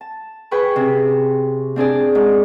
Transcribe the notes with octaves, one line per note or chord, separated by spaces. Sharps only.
A5
G#4 B4 G5 B5 C#6
C3 C#4
C4 D4 G#4 D5
G#2